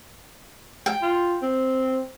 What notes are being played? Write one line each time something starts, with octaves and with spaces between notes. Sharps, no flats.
G5
F4
C4